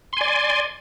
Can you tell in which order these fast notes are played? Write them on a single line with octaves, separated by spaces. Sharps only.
C6 G#5 D5